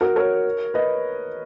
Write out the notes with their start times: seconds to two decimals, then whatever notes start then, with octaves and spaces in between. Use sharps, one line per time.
0.01 F#4 A#4
0.16 A#4 C#5
0.74 B4 D#5